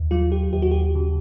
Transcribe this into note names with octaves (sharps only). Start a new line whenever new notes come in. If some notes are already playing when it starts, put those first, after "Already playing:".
Already playing: D#2
F#3 F4
G4
D#2 G4
F#4
G4
C#3